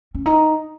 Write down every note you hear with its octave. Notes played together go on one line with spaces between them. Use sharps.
C#4
D#4